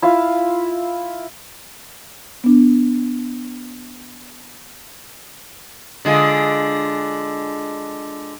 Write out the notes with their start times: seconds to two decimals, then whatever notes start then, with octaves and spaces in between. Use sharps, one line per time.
0.02 E4 F4 F5
2.44 B3 D4
6.05 D3 G#3 F4